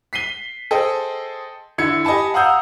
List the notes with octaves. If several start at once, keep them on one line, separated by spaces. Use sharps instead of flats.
B6 C7 D#7 G7
G#4 A4 C5 D#5 G5
D3 E4 E6 G#6 C#7
G4 D#5 G#5 A5 B5
F5 F#5 A#5 D#6 E6 G6